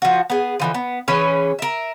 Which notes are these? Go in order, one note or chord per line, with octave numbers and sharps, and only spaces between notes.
F3 F#4
B3 G#4
D3 E3 F3
B3
E3 C#4 G#4 B4
A#4 E5